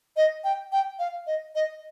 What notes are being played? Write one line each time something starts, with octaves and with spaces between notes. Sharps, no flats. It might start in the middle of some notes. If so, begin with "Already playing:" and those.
D#5
G5
G5
F5
D#5
D#5